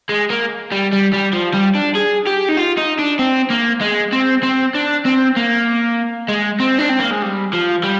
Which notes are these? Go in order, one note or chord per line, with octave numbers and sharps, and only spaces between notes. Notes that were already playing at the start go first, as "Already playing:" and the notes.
G#3
A#3
G3
G3
G3
F3
G3
D4
G#4
G4
D#4
F4
D#4
D4
C4
A#3
G#3
C4
C4
D4
C4
A#3
G#3
C4
D4
C4
A#3
G#3
G3
F3
G3